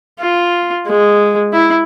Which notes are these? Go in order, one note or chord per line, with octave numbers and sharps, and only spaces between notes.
F4
G#3
E4